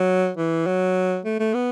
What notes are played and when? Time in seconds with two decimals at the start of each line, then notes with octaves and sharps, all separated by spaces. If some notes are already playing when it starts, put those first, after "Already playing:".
Already playing: F#3
0.37 E3
0.67 F#3
1.25 A3
1.40 A3
1.54 B3